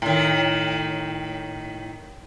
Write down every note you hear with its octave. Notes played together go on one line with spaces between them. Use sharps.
A2 D#3